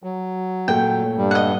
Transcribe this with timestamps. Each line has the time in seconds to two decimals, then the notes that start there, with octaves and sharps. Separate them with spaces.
0.03 F#3
0.68 A#2 A3 G5
1.17 G2 G3
1.31 D#5 F#5